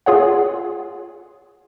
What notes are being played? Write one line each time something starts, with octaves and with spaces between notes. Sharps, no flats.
F4 G#4 C#5 F#5